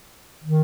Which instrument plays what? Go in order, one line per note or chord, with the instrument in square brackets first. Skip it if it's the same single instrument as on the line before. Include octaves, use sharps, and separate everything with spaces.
[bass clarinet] D#3